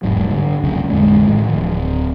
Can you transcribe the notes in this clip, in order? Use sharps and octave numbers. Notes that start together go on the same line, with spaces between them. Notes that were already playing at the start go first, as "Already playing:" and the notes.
E1 G#2 F#3
G2 D3
C#2 F#2 C#3
A1 F2 D3 G#3
A2 D#3 F3
D1